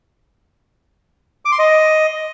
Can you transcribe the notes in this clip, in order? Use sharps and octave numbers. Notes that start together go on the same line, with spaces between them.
D6
C6
D#5